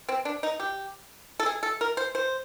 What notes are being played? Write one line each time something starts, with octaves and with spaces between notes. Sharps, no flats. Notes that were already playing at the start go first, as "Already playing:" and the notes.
C4
D4
D#4
G4
A4
G#4
A4
A#4
C5
C5